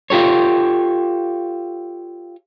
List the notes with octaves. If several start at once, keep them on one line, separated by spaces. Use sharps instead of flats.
F4 G4 A4 C#5